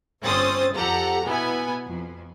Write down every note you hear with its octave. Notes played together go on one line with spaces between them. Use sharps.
G1 C4 C#4 C5 D#6 A6
F2 G4 A4 F#5 A#5
B2 B3 E4 G#5
F2